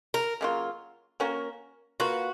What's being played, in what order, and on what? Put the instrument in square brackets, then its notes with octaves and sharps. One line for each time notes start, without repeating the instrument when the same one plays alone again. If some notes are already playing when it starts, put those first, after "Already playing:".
[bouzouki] A#4
[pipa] C#3 F#3 A#3 F4
A#3 C#4 F#4 A#4
[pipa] A#3 F4 B4 [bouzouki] F#4